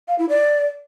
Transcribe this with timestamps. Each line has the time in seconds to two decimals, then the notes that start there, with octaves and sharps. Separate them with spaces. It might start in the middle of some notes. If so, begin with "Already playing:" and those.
0.08 F5
0.18 E4
0.29 D5